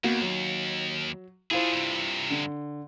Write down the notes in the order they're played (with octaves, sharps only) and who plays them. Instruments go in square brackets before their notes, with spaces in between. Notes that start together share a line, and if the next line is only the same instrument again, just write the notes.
[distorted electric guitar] D#2 [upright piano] A#3 B3 F#4
[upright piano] F#3
[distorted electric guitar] D4 G#4 [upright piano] E4 F4 C5
[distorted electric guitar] G2 C3
[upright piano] D3